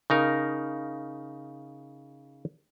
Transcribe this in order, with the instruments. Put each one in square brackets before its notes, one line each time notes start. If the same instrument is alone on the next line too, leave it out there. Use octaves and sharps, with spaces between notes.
[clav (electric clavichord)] C#3 D#4 A#4